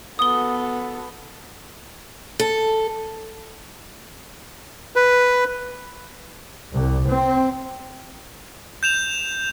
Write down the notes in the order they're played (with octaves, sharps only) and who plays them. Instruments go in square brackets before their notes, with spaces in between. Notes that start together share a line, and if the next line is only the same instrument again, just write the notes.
[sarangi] B3 [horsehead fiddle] F#4 A4 [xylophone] D#6 G7
[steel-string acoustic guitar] A4
[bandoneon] B4
[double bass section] C2
C4
[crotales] G6 E7 F7